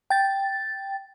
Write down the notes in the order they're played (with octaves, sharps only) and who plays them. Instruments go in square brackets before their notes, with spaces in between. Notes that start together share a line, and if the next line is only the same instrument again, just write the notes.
[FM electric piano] G5 A6